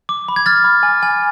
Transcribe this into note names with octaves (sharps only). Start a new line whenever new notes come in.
D6
B5
G#6
F6 A6
B5
G#5
G#5